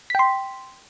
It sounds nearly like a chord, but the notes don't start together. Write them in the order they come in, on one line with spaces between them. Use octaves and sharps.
B6 G5 C6